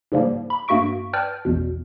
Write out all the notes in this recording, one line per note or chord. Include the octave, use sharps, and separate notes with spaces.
G#2 C#3 F3 G3 A#3
B5
G2 A#3 F#4 E5 C#6 D7
B4 D5 G5 A5 F6 G6
A1 E2 B2